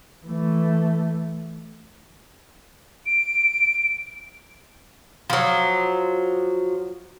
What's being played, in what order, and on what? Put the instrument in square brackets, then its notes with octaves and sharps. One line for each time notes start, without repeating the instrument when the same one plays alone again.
[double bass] E3 A3
[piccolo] D7
[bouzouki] F3 F#3